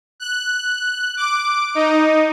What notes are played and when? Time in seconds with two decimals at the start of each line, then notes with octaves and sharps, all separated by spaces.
0.20 F#6
1.17 D6
1.75 D#4